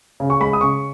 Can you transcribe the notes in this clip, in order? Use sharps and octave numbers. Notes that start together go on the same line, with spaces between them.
C#3
C#6
G#3 B5
D#6
C#3 C#6